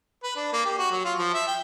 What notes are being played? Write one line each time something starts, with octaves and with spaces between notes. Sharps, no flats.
B4
D4
A#3
G4
F#4
F#3
F4
F3
E5
G5